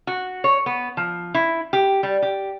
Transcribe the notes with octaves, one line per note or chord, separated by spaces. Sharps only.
F#4
C#5
B3
F3
E4
G4
G3
G4